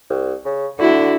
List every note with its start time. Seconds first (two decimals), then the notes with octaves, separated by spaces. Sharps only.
0.10 C2
0.45 C#3
0.79 D3 D4 E4 F#4